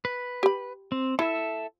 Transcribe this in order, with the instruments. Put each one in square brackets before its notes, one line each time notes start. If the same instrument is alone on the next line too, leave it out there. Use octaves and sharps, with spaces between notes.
[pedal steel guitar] B4
[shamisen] G4 B5
[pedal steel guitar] C4
[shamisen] E4 [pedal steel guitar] A4 E5